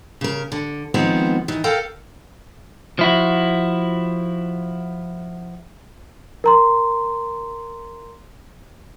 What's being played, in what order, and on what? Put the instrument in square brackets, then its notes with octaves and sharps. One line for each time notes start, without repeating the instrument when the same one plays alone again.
[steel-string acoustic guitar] C#3 A#4
D3
D#3 F3 G#3 B3 C4
D#3 E3
A4 A#4 F5 G5
[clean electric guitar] F3 E4 F#4
[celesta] A#4 A#5 C6